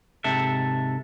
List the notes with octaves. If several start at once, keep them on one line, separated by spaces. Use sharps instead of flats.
G#2 C3 A4 E5